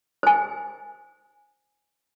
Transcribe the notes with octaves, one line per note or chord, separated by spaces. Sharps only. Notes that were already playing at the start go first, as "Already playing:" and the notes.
C5 G#5